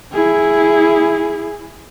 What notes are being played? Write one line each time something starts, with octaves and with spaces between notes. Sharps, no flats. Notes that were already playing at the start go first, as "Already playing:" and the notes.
E4 G#4